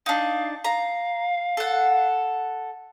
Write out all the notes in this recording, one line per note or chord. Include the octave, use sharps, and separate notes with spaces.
D4 D#4 F5
F5 A#5
A4 F#5